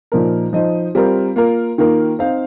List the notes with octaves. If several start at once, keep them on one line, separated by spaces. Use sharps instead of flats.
A#2 F3 D#4 A#4
F3 D#4 C5 D#5
G3 C4 F4 A#4
A#3 F4 A#4
D#3 A#3 F4 A#4
C4 D#4 C5 F5